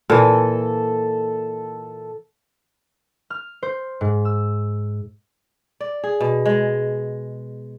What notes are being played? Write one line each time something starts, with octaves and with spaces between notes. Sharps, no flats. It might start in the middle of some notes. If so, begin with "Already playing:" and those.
A#2 E3 A4
F6
C5
G#2
E6
D5
G#4
B2
G#3